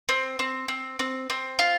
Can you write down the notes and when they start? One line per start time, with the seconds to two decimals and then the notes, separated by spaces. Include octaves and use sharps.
0.09 C4
0.39 C4
0.68 C4
0.99 C4
1.30 C4
1.59 F4